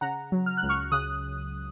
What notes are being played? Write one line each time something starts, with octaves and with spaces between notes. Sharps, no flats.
C#3 F#5 A#5
F#3
F6
F#6
C#2
C#6 F6
C#3 D#6 F#6